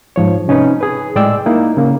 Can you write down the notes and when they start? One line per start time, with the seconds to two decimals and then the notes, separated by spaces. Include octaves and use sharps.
0.16 G#2 F3 C#5
0.48 C3 C#4 D#4 B4
0.81 G#4 B4
1.16 A2 G#3 D5 G5 E6
1.46 A#3 D#4 E4
1.77 C#3 A#3